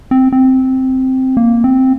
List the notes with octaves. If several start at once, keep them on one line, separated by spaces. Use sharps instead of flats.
C4
C4
A#3
C4